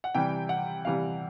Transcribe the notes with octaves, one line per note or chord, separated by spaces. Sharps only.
F#5
C3 E3 G3 G5
F#5
C3 E3 G3 F5